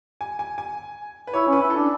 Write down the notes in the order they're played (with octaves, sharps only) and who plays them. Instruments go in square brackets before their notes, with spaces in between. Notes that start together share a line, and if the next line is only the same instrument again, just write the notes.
[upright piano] G#5
G#5
G#5
B4
[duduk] E4 [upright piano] C#5
[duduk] C#4
[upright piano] B4
[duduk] E4
[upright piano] A4
[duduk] D4